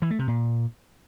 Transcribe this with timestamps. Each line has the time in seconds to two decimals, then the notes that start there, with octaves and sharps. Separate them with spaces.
0.02 E3
0.10 A3
0.19 C3
0.28 A#2